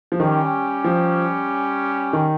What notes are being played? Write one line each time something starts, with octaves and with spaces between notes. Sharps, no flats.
F3
D#3 G3 C#4 G4
F3
D#3